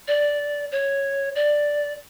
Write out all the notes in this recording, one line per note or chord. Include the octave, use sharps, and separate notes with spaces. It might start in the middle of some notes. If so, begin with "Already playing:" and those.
D5
C#5
D5